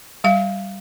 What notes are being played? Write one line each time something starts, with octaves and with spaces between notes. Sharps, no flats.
G3 F5